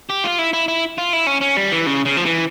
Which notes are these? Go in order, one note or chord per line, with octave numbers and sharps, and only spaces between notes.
G4
F4
E4
E4
E4
F4
E4
C#4
C#4
G3
E3
C#3
C#3
F3
E3